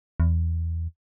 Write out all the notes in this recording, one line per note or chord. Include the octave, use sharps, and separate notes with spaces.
E2